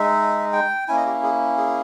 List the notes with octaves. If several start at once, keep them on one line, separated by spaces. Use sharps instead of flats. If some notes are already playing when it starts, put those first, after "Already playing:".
Already playing: G#3 D#4 E5
G5
A#3 C#4 E4 G#5
D#5
G4
G#4
G#4